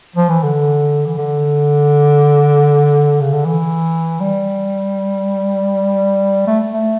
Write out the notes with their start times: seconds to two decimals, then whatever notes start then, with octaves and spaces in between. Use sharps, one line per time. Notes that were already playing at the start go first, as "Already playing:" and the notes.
0.16 F3
0.29 E3
0.43 D3
1.06 E3
1.18 D3
3.21 C#3
3.33 D3
3.45 E3
4.20 G3
6.47 A3
6.72 A3